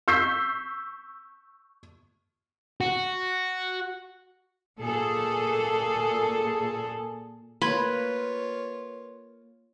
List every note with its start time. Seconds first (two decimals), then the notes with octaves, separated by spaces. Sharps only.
0.08 C#6 E6 G6 B6 C7
2.81 F#4
4.80 A#2 G#4 A4
7.62 A#3 F4 B4 C#5 B5 C6 G#6